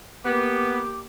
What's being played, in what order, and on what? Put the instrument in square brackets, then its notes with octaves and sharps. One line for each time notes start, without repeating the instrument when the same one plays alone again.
[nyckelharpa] A#3 G4 [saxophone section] B3 [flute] D6